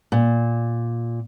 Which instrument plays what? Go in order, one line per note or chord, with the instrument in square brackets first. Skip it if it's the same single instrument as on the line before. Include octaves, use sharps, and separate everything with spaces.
[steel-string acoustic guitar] A#2